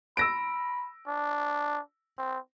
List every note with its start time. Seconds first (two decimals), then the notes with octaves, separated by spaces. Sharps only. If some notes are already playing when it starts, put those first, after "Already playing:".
0.17 B5 E6 A#6 D7
1.07 D4
2.18 C4